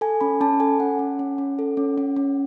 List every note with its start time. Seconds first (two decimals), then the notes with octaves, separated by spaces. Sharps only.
0.01 A4 G#5
0.21 C#4 B5
0.41 C#4 A5
0.60 A4 G#5
0.79 C#4 F#5
0.99 C#4
1.19 C#4
1.38 C#4
1.59 A4
1.77 C#4
1.98 C#4
2.16 C#4